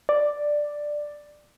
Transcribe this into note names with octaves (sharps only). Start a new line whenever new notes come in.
D5